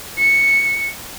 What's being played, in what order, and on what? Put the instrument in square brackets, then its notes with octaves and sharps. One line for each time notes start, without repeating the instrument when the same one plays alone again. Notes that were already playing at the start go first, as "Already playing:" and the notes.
[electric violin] C#7